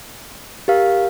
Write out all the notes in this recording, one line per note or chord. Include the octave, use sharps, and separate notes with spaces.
G4 A#4 F5